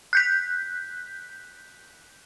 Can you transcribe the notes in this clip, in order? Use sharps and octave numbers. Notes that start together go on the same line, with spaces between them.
F#6 G6 B6